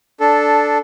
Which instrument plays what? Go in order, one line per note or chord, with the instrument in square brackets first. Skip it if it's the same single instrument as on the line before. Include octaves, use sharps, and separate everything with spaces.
[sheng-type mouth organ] D4 A4